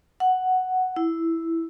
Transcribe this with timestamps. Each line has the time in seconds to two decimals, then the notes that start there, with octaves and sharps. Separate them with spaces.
0.20 F#5
0.96 E4